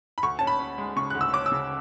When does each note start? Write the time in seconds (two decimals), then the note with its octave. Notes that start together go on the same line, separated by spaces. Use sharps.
0.18 B5
0.23 D2 C#6
0.39 C#4 A5
0.47 B5
0.60 C#4
0.78 G#3
0.96 C#3 C#6
1.10 D2 F#6
1.21 E6
1.33 C#4 D6
1.46 E6
1.52 C#3